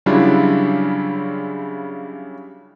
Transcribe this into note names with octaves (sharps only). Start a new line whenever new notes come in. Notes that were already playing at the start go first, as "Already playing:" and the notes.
C#3 F#3 G3 D4 E4 F4